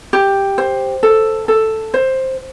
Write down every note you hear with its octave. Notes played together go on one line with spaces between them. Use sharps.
G4
C5
A4
A4
C5